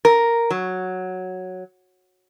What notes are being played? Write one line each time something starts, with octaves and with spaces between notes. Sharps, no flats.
A#4
F#3